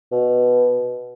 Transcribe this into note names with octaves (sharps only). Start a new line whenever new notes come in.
B2